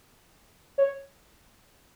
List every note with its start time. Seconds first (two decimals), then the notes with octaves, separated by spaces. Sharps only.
0.78 C#5